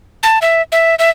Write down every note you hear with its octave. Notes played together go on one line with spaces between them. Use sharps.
A5
E5
E5
E5